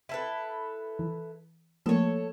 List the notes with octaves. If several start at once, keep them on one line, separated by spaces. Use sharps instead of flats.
E4 A4 B4
E3
F3 A3 A#3 A4 C#5